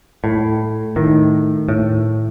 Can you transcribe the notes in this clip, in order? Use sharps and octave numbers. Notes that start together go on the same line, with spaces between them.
A2
A2 D#3
A2